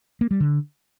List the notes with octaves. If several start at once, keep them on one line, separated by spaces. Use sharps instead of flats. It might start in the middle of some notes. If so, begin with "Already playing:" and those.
A#3
G3
D3